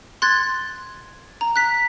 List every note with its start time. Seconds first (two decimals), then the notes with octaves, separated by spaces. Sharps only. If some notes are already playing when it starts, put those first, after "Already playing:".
0.22 C6 F#6 G#6 A6
1.41 A#5
1.56 F#6 B6